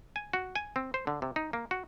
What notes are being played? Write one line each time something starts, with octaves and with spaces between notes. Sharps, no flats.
G#5
F#4
G#5
C4
C5
D3
C3
D#4
A#3
F#4